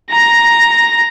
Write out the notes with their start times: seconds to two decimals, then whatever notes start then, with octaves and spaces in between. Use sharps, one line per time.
0.12 A#5 A#6